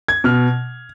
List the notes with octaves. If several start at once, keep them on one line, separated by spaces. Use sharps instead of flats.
G#6
B2 F6